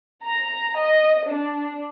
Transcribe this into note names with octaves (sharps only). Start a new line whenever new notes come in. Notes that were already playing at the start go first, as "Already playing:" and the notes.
A#5
D#5
D4